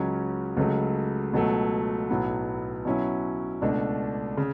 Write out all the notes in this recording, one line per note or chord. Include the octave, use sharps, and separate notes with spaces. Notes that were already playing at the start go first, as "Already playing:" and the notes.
Already playing: C#2 C#3 F#3 C#4
C#2 C#3 F#3 A3
C#2 B2 F#3 A3
B1 A2 F#3 B3
B2 F#3 C#4 E4
C#2 B2 A3 D4
C#3